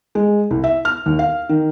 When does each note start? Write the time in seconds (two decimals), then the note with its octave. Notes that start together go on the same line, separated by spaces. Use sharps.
0.15 G#3
0.51 C2
0.64 E5
0.85 F6
1.06 D#2
1.19 F5
1.49 D#3